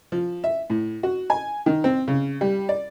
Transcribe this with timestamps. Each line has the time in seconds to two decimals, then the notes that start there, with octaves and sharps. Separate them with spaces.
0.12 F3
0.44 E5
0.70 A2
1.03 F#4
1.30 G#5
1.66 D#3
1.84 C4
2.08 C#3
2.41 G3
2.69 D5